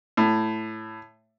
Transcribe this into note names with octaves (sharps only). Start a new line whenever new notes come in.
A2